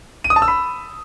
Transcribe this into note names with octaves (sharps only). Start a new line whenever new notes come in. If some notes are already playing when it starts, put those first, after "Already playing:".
D#7
D#6
A5
E6
B5